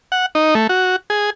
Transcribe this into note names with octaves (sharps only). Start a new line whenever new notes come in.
F#5
D#4
A3
F#4
G#4